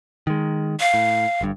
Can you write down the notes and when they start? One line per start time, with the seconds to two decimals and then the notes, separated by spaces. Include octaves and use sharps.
0.27 D#3 G#3
0.80 F5
0.94 A2
1.41 G1 G2